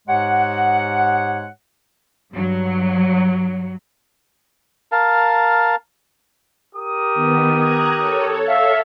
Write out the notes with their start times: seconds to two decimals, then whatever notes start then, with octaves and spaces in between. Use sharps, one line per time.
0.08 G#2 G#3 G4 C#5 F#5
2.34 G2 F#3
4.92 A#4 F5 A5
6.75 G4 A#4 D#6
7.14 D#3 B3
7.56 A#5 F#6 G#6
7.97 A4 C#5
8.48 E5 F5